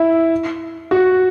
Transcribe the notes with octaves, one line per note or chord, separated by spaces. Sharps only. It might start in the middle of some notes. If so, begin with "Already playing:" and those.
Already playing: E4
F#4